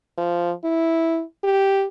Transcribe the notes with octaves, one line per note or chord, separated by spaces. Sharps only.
F3
E4
G4